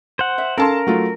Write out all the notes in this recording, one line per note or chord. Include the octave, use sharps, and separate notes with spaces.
C5 F#5
E5
C#4 A4 A#4 F5 A5 C6
F#3 A3 F4